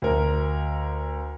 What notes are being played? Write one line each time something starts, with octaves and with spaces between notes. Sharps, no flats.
D2 A#4